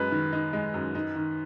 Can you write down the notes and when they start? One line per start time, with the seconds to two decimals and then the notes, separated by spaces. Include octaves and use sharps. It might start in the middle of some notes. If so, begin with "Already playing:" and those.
Already playing: F#2 G#3 B4
0.12 D#3
0.32 D#4
0.53 G#3
0.74 F#2
0.95 D#4
1.16 D#3